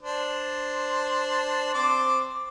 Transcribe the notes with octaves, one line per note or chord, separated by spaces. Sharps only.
D4 C5
C4 C5 D6